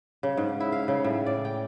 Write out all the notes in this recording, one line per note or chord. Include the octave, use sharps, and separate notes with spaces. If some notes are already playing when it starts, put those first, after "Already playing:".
C#3
G#2
E4
F5
C#3
A2
D5
G5